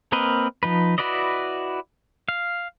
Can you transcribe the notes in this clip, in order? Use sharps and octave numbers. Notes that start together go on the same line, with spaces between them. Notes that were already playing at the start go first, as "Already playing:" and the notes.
A#3 C4 A#4 B4 D#5
F3 D#4 B4
E4 F#4 B4 D5 D#5
F5